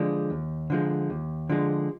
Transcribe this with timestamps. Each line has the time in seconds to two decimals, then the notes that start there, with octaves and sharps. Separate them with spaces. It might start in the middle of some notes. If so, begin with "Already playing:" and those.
Already playing: D3 F3 G#3
0.30 D#2
0.70 D3 F3 G#3
1.10 D#2
1.49 D3 F3 G#3